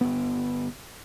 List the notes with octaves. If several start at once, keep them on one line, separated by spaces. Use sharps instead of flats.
G1 G2 B3